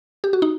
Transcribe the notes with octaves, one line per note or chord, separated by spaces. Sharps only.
G4
F#4
D#4